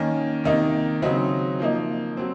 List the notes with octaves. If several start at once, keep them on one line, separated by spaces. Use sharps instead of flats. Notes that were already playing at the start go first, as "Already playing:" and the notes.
Already playing: D#3 A#3 C#4
C3 D#3 A#3 D#4
C#3 F#3 C4 D#4
F3 A#3 D#4
F#3 C4